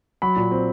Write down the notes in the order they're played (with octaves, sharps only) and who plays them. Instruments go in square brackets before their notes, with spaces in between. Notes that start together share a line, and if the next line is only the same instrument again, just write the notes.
[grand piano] F#3 B5
A#2
C4